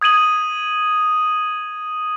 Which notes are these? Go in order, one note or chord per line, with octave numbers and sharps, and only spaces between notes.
D#6 G#6 D#7 F#7